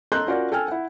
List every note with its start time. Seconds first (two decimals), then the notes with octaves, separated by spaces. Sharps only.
0.12 A4 D#5 A#5 C6 F#6 G6
0.27 C#4 F4 F#4 A#4 D5
0.52 A4 G5 G#5 F6
0.68 E4 F#5